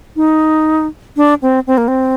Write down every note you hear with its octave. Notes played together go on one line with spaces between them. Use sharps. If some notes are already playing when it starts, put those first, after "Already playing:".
D#4
D4
C4
C4
A#3
C4